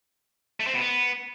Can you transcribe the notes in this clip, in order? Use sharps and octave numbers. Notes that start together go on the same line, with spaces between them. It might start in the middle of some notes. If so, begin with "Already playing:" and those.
A3
C4
B2
B3